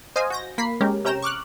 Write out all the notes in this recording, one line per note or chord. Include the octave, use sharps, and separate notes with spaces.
C5 D#5 F5 G#5
F#4 G6 A#6
A#3 B5 B6 C7
G#3 C#4 G4 A#4
C3 C#4 G5 A#5 E7
C#6 D6 F6 F#6